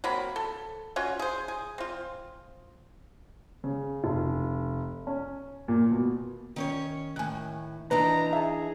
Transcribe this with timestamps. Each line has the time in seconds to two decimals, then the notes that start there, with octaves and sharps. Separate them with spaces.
0.04 F#3 A#3 C4 B5
0.36 A4
0.96 C#4 F4 F#4
1.19 G#4 C5
1.48 G#4
1.78 C4 F4
3.64 C#3
4.04 F1
5.07 C#4
5.68 A#2
5.91 B2
6.56 D#3 C#4 C#5
7.16 A2 D#3 G#5 F#6
7.91 E3 D4 D#4 B4 A#5
8.33 G#4 E5 A5